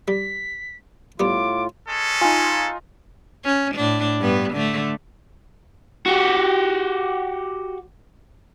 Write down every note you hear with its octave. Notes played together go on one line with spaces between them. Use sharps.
G3 B6
A2 G3 B3 F4 D6
G#3 C#4 A4
D#4 F4 G#5
C#4
A2 D4
G2 B3
D3 A3
F#4 G4